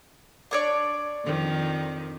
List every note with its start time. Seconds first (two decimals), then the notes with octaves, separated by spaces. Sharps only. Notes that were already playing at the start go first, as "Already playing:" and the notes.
0.51 D4 C#5 D5
1.24 F2 D#3 F3